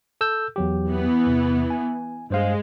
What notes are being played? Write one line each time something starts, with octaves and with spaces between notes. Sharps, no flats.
A4 E6 G6
E2 F#3 G4
E3 B3
E2 C3
G#5
G2 G#3 C5 F5